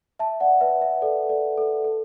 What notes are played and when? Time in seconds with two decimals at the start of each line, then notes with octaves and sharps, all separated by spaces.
0.19 E5 A5
0.40 D5 F#5
0.61 B4 E5
0.81 B4 E5
1.02 A4 D5
1.29 A4 D5
1.58 A4
1.84 A4